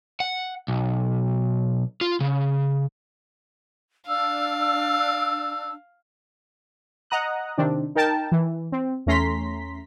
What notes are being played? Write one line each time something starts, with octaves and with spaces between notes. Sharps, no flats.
F#5
B1
F4
C#3
D4 F5 E6
D#5 F#5 A#5 D#6 F#6
C3 D#3 C4 D4
D#4 A#4 G5 A5
E3
C4
E2 A3 C#4 A#5 C6 B6